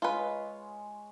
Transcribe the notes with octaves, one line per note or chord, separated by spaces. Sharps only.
G#3 F4 B4 C#5